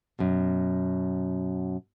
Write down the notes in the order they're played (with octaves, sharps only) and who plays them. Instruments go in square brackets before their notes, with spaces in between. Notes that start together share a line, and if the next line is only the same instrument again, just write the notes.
[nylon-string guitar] F#2 B2